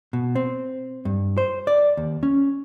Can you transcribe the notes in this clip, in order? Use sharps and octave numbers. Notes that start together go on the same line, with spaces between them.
B2
C4
G2
C5
D5
D#2
C#4